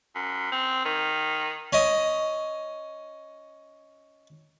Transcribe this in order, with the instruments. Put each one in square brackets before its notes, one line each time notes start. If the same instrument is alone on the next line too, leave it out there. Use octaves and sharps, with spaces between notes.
[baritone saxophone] F#2
C4
D#3
[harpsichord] C#4 D#5